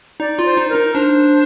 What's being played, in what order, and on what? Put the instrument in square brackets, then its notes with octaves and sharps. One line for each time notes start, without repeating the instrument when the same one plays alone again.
[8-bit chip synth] D#4 [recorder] D5
[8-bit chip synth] F4
[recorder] C5
[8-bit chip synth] D#4
[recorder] A#4
[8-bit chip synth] D#4
[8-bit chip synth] D4 [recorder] C5